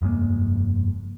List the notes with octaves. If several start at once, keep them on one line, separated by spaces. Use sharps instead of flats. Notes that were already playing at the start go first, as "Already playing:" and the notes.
F1 G2 G#3 A#3